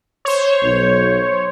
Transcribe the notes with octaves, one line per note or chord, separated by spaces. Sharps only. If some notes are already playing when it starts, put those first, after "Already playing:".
C5 C#5
B1